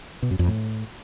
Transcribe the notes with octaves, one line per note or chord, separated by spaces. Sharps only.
B2
F#2
F2
A2